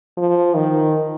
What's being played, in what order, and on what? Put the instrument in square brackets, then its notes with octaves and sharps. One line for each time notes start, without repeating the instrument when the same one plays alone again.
[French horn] F3
D#3